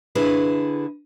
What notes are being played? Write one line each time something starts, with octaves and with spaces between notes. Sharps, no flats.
D3 E4 G#4 B4